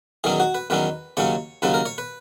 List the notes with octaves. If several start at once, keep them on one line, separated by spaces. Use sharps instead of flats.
E2 D#3 F#3 C#4 G#4
F#4
B4
E2 D#3 F#3 C#4 B4
D#2 C#3 F#3 C#4 C#5
D#2 C#3 F#3 C#4 B4
A#4
C#5
B4